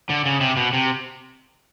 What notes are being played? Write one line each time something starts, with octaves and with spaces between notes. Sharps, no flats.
D3
C#3
C3
B2
C3